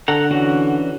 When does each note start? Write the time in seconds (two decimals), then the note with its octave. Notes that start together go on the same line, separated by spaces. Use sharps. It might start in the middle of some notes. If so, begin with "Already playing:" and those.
0.08 D3 A4 F#5 A#5
0.31 E3 C#4 F#4